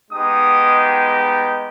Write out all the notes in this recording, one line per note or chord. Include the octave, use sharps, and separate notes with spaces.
G#3 B3 D#4 G4 D#6